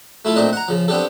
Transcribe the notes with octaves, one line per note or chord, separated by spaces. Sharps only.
A3 E4 F4 A4
A#2 A3 C4 D4 D#4 D#5
F#5 A#5
C#3 F3
B3 C4 D4 G4 A4